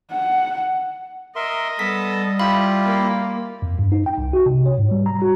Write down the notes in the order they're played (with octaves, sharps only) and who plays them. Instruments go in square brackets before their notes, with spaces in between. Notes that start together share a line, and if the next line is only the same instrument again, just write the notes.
[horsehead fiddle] F#5
[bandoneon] A#4 E5 C6 [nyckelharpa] D#5
[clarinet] G3 [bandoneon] B3 A4 A5 [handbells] B6
[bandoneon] E4 F4 G4 [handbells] F5 B5
[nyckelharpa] A#3
[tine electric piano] F2
G2
D#4
G5
C2
F#4
C3
C#5
G#2
G3
A#5
F#4